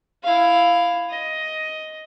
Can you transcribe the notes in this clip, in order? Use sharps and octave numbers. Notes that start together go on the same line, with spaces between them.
E4 F5
D#5